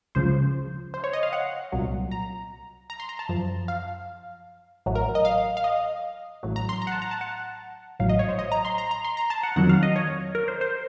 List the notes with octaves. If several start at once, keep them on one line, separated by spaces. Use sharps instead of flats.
C#2 C#3 F3 C5
C5
C#5
D#5
F5
F#5
C2 A#2 F#3
A#5
A#5
C6
A#5
A5
F#2 F3
F5
A1 A2 F#3
A#4
D#5
F5
F5
D#5
A1 A2 F#3
A#5
C6
A#5
F#5
A5
A#5
A5
F#5
A1 A2 F#3 F5
D#5
C#5
C5
D#5
A#5
C6
A#5
A#5
C6
A#5
A5
F#5
F2 D#3 F#3 F#5
F5
D#5
C#5
A#4
C5
C5